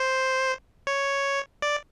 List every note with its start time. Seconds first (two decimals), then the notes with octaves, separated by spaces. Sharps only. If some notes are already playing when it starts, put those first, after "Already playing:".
Already playing: C5
0.87 C#5
1.62 D5